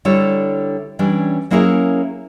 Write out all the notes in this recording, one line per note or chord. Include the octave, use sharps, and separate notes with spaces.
D3 G3 E4 A4 C#5
E3 G3 C#4 D4
F#3 A#3 C#4 E4 G#4 A#4